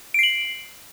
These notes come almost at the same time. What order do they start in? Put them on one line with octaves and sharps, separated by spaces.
D7 C7 F#7